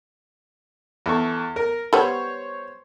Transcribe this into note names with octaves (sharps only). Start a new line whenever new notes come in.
E2 A4 C#6
A#4
G3 B3 C5 C#5